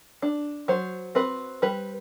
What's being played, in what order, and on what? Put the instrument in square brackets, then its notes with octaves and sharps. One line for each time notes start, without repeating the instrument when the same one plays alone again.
[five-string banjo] D4
F#3 C5
C4 B4
G3 B4